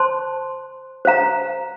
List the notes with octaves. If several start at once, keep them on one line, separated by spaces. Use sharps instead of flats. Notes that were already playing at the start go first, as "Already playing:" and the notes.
Already playing: C5 A5 C6
C5 F5 A#5